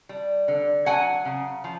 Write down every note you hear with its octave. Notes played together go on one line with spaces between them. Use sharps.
G3
D3
F#3 F#5 G#5
C#3
F3